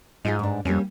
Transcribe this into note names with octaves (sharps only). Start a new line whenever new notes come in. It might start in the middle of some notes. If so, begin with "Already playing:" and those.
G#2 D#4 F4 G#4
G2 D4
F2 G3 A#3 C#4